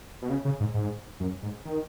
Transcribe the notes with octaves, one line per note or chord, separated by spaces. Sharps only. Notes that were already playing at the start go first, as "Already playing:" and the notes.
B2
C#3
C#3
G#2
G#2
F#2
G#2
D#3